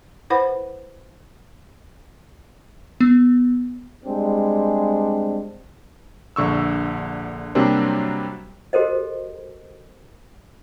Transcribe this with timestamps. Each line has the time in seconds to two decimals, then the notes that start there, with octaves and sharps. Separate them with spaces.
0.30 E4 B4 C5 F#5 B5
3.01 B3
4.05 G3 G#3 C4 D4
6.36 A#1 D3 C#6 E6
7.55 C3 F#3 G3 A#3 C4 D4
8.73 F#4 G4 A4 A#4 C5 D#5